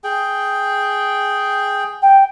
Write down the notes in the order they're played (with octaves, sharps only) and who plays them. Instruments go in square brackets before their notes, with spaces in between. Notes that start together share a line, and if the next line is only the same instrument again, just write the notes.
[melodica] G#4 G5
[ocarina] G5